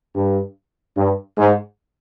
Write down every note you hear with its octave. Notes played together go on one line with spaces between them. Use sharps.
G2
G2
G#2